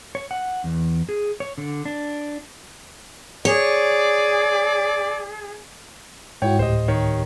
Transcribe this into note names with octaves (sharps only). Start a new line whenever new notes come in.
C#5
F#5
E2
G#4
C#5
D3
D4
G#4 C#5 D5
G#2 E4 F#4 C#5 G5
D2 A2 G4 C5 D#5
D#3 C#5